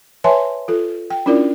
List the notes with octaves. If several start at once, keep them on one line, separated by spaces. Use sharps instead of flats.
B4 C#5 E5 G#5 A5 C6
F4 A4
G5
C#4 D4 E4 F4 A#4 D5